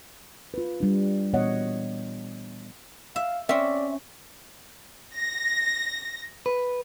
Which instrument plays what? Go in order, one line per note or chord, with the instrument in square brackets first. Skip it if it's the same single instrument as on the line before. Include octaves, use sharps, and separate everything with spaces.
[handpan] F4 B4
G3 D4
A#2 E3 B3 C#5 D#5 F#5
[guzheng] E5 [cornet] F5
[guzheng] C4 C#4 [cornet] D5 [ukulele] E5
[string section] A#6
[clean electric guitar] B4